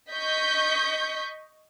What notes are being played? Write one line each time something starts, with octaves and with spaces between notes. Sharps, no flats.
D#5 C#6 G6 B6